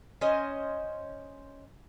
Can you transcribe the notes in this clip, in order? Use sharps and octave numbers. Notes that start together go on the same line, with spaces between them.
C#4 C5 D#5